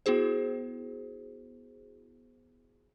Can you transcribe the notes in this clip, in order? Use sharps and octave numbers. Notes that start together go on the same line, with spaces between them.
B3 E4 F#4 G#4 C5